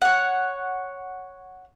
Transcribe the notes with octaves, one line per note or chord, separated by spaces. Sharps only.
C#5 F#5